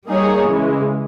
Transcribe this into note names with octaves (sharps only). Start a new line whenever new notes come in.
G3 A#3 D#4 G#4 C#5
C#3 E3 G#3